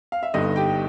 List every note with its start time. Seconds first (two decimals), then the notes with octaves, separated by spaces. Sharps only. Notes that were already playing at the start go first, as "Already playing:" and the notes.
0.12 F5
0.23 E5
0.34 G1 G2 D3 D#4 D#5
0.56 G4 G5